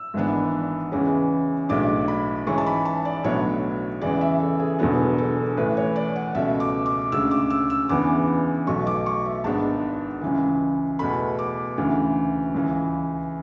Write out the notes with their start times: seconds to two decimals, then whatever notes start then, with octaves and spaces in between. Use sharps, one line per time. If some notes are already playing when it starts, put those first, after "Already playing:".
Already playing: E6
0.14 G#1 G#2 E3 B3 D4
0.92 E2 C#3 E3 G#3 C#4
1.69 B1 A2 G#3 D4 D6
2.08 B5
2.46 G#2 E3 G#3 C#4 C#6
2.58 A5
2.66 B5
2.85 A5
3.05 D5
3.24 B1 A2 F#3 B3 D4 C#5
4.01 E2 C#3 E3 G#3 D5
4.21 E5
4.40 A4
4.59 G#4
4.79 E1 E2 D3 F#3 B3 A4
5.18 A4
5.57 A1 A2 E3 A3 B4
5.77 C#5
5.96 D5
6.16 F#5
6.35 C#2 B2 A3 E5
6.60 D6
6.86 D6
7.12 D2 C#3 G#3 E6
7.31 D6
7.50 E6
7.70 E6
7.89 E2 C#3 E3 B3 D4 D6
8.67 B1 B2 F#3 A3 C#6
8.87 D6
9.06 C#6
9.26 E5
9.44 G#1 G#2 G#3 B3 D4 A5
10.21 C#2 C#3 E3
10.99 E2 B2 A3 B5
11.39 D6
11.77 D2 C#3 E3
12.54 C#2 C#3 E3